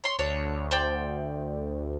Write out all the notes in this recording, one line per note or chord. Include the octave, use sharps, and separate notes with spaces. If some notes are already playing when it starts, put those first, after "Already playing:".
C#5 C6
D2 D4 C#5
C5 D5 G5